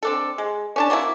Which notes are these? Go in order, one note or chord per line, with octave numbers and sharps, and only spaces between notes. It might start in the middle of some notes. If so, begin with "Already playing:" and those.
C4 D4 A4
G#3
C#4 D4 A5
F#3 A#3 C4 E4